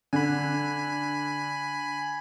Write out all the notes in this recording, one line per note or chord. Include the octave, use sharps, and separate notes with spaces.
D3 G#5 B5